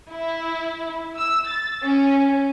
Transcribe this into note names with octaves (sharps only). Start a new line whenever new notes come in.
E4
E6
A6
C#4